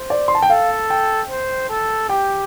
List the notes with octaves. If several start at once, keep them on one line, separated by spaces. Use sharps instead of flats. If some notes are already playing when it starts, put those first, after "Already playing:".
Already playing: C5
D5
C6
A5
G5
A4 F5
G5
C5
A4
G4 G5